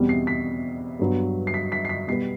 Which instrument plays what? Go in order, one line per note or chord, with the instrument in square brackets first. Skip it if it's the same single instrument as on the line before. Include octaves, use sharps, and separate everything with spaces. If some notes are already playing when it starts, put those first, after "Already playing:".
Already playing: [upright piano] E2 B2 G3 C4
C7
B6
G2 F#3 B3
C7
B6
B6
C7
B6
B2 G3 B3 C7